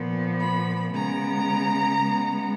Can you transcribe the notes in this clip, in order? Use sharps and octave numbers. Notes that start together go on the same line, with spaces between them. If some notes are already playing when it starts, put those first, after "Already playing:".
Already playing: A#2 F3 B3
B5
C#3 G#3 B3 A#5
C#3 G#3 B3